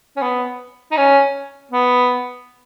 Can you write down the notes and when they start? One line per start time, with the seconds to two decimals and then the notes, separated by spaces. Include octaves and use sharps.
0.17 C#4
0.22 B3
0.92 D#4
0.97 C#4
1.71 B3